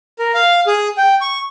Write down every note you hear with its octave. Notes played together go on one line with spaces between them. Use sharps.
A#4
F5
G#4
G5
C#6